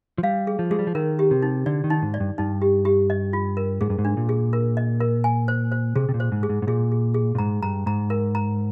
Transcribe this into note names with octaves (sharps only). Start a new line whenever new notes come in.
F3
G3 F5
G#4
F3
G#3 G#4
G3
F3
D#3 A#4
G4
C3
D#4
D3 D5
D#3
D#4
G#2
D5
G2
G2 D#4
G4
G4
D#5
F4
A#4
G#2 G#4
G2
G#2
D4
A#2
G#4
A#4
D#5
A#4
G#5
C5
C5
C3 G#4
C3
A#2
C5
G#2
G#4
G#2
G#2
A#2 G#4
G#4
G#4
A#2
G#2 A#5
G2 A#5
G#2 A#5
A#4
A#5